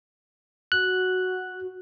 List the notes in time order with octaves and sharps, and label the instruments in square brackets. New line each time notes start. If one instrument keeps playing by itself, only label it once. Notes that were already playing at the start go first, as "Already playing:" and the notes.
[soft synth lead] F#4 [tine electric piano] F#6